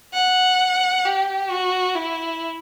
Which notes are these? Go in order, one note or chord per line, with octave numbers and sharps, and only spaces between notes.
F#5
G4
F#4
E4